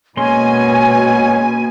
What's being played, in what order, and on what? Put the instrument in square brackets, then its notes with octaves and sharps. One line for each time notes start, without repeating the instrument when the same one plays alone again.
[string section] B2 [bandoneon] G#3 C#4 [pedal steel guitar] A#3 C6 [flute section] G#5